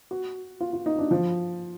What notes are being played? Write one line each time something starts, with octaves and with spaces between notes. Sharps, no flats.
F#4
F4
F4
D#4
D4
F3